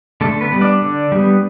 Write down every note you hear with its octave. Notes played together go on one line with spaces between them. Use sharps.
D3 A3 A4
B3 B4
G3 B3
D4 D5
D3
G3 B3